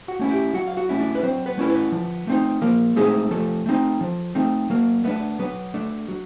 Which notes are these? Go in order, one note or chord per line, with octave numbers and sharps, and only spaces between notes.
F#4 F#5
A3 C#4 E4
G4 G5
F#3 F#4 F#5
F5
F#4 F#5
A3 C#4 E4
D4 D5
B4
F#3 C4 C5
B3 B4
A3 C#4 E4 A#4
B3 B4
F3
A3 C4 D#4
F3 A#3 A#4
G#3 A3 C4 D#4 G#4
F3 A3 A4
A3 C4 D#4
F3
A3 C4 D#4
F#3 A#3 A#4
A3 B3 D4 B4
F#3 B3 B4
A3 D4
F#3